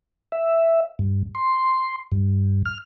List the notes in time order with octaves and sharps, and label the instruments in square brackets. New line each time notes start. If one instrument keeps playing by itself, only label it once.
[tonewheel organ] E5
G2
C6
G2
F6